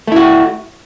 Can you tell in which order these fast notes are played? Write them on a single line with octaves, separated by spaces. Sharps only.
A3 E4 F#4